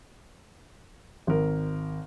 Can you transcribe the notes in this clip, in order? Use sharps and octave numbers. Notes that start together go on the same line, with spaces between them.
G#1 A#4